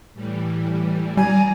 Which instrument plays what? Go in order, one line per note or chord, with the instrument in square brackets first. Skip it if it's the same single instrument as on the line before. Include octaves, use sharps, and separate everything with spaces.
[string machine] A2 E3 G3
[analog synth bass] G3 [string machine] D5 A#5 [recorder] G#5